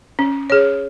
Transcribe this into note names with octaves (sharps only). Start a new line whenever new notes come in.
C#4
G#4 C#5